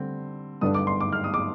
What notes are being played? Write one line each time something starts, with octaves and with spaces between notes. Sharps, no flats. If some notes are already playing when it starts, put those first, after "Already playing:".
Already playing: D3 G3 C4
G2 D3 G3 D4 D#6
D6
C6
D6
F6
D#6
D6